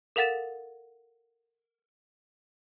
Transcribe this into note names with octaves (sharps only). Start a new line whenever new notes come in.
A4 A#4 F5 F#5 A6 E7